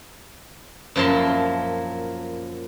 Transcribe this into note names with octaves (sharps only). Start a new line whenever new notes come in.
F#2 A#2 F3 E4 A5 C6